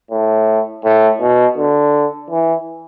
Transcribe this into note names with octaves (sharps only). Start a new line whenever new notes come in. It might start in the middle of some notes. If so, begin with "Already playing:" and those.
A2
A2
B2
D3
E3